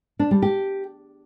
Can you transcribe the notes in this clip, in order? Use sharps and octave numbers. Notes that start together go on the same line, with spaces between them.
D4
G3
G4